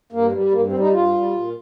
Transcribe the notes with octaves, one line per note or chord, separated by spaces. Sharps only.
G2 A#3
G3
G2 A#3
C4
G3
D#4
G2 F4
G3
A#2